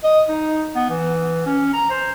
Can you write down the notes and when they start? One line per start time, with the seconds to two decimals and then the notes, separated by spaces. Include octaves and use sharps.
0.04 D#5
0.28 D#4
0.75 B3
0.90 E3
1.46 C#4
1.73 A#5
1.90 C5